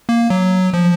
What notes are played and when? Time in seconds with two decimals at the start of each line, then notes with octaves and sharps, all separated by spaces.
0.09 A#3
0.30 F#3
0.74 F3